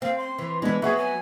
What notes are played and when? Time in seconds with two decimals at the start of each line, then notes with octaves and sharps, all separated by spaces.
0.02 C4 F5
0.18 C6
0.39 E3
0.62 E3 G#3 B3 D4
0.82 F#3 B3 G#4 E5 F#5 C#6
0.97 G#5